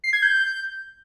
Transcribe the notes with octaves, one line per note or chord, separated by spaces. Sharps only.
C7
G#6
G6